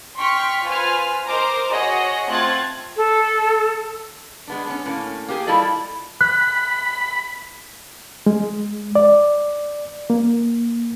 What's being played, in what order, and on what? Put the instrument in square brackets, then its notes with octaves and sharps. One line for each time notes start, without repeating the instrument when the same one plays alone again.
[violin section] G5 C6 C#6 F6 B6
F4 B4 C5 G#5 F6
A#4 C5 D#5 A#5 D6
F#4 G#4 C#5 D#5 F#5
A3 C4 F4 F#6 G#6 A6
[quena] A4
[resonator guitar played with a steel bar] G#3 B3 D4
B3 C#4
A2 A#3 C#4
A#3 G4 G#4
G3 E4 F4 A4 D5 D#5
[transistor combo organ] B5 [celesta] F#6
[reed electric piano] G#3
D5
A#3